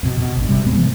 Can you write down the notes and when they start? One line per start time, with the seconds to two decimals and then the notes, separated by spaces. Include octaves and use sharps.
0.03 F2 B2
0.20 B2
0.37 G#1 G2
0.48 C3 G3
0.64 D1 G#2 G#3 B3
0.76 C3 E3 F3